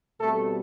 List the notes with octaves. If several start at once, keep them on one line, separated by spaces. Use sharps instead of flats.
B2 G3 A3 C4 A4